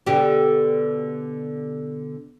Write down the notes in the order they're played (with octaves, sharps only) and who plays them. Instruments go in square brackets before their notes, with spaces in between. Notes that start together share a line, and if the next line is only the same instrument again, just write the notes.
[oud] B2 D3 G4